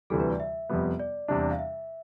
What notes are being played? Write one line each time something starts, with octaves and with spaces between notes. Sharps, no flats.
D2 C3 E3 G3 A4
B4
D5
E5
F2 C3 G3 B3
D5
E2 C3 G3 D4
F5
E5